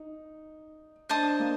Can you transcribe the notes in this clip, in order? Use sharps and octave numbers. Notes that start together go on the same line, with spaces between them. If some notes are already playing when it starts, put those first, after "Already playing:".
Already playing: D#4
D4 C5 D#5 A5 D#6
A#3